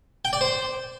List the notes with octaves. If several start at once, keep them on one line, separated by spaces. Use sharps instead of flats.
G5
D5
C5